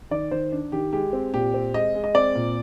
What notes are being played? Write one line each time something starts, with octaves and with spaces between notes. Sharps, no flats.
D#3 D5
D#3 C5
D4
D#3 G4
G#3 G4
C4
A#2 G4
C4
G#3 D#5
G#3
D#5
C4 D5
A#2